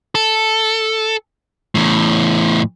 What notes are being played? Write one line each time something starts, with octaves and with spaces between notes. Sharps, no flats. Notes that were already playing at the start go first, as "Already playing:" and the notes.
A4
E2 A2